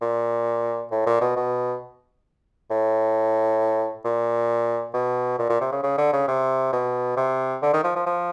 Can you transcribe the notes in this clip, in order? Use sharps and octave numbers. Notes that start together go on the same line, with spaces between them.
A#2
A2
A#2
B2
B2
A2
A#2
B2
A#2
A#2
C3
C#3
C#3
D3
C#3
C3
B2
C3
D3
D#3
F3
F3
F3